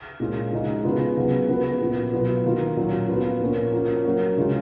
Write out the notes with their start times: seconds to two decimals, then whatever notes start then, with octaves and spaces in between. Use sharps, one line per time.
0.20 A#2 G#3 C#4 F4
0.52 C#3 F3 G#3 D#4 F#4
0.84 C#3 F3 B3 F4
1.17 C#3 F#3 B3
1.49 C#3 F3 B3
1.81 A#2 F3 B3 F#4
2.13 B2 F#3 B3 F4
2.45 D#3 A#3 F4
2.77 A#2 F#3 C#4 F4
3.09 A#2 F3 B3 F4
3.41 A#2 F3 A#3 C#4
3.72 F3 A#3 C#4 F#4
4.05 F#3 A#3 C#4 F#4
4.37 C#3 G#3 C#4 F4